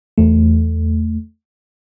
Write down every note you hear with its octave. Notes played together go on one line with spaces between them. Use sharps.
E2 A3